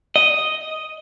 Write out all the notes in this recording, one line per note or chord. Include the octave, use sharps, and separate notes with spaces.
D#5